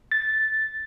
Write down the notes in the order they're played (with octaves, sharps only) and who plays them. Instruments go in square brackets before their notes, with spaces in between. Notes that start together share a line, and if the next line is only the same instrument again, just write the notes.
[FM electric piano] A6